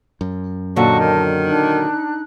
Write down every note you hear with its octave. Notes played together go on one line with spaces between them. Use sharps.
F#2
A#2 D3 F#3 F#4 G4 D#5 A5
D#3
D4 D#4 F#6